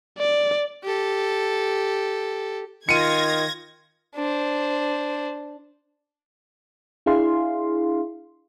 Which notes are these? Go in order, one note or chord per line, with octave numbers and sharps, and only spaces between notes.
D5
G4 A4
D#3 F4 G#6 A#6 C#7 D#7
D4 C5
D4 E4 G#4 F5 C6